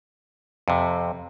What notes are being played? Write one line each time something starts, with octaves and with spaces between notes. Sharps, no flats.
F2 C3